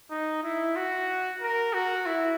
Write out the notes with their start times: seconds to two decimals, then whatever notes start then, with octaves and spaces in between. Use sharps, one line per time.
0.11 D#4
0.43 E4
0.76 F#4
1.41 A#4
1.74 F#4
2.06 E4